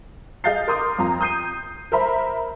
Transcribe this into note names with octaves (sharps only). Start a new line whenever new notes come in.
G#4 D#5 F5 G6 A6 C7
A#4 C6 D6 D#6
F2 F4 A#5
D#6 G6 C7 D#7
A#4 C5 E5 A#5 B5